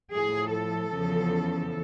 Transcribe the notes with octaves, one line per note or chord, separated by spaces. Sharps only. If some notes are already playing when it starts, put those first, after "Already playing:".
A2 F3 G#4
A4
E2 C#3 F3